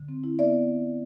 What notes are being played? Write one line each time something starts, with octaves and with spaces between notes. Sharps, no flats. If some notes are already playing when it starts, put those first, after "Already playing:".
Already playing: D3
C4
E4
B3 D5 E5